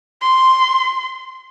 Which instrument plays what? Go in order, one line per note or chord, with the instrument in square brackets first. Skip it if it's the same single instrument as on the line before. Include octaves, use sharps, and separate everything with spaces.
[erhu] C6